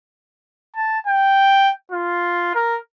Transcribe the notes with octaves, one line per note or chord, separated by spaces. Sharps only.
A5
G5
F4
A#4